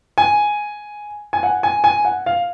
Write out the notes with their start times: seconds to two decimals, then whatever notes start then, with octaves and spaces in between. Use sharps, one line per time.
0.18 G#5
1.33 G#5
1.43 F#5
1.63 G#5
1.84 G#5
2.05 F#5
2.26 F5